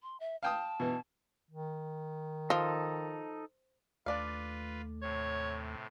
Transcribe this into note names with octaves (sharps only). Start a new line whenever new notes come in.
C6
E5
F5 G5 A5 D#6
B2 E3
D#3
F3 D#4 A4 D#5
D#2 A3 D4 F4 B4 D5 F5
A2 C3 C#5